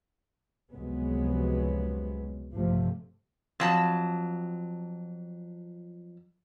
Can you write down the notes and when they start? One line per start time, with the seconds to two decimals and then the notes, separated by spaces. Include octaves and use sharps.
0.72 F1 C#2 C3 F#3 G#3 B3
2.54 A1 G2 C3 F3 A3
3.60 F2 F#3 A5